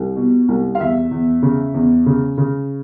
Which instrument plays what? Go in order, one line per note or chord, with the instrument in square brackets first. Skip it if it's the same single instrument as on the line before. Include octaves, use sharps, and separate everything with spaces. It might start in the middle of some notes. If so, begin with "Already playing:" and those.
Already playing: [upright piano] C2
B2
C2
F5
E2 E5
E2
C#3
E2
C#3
C#3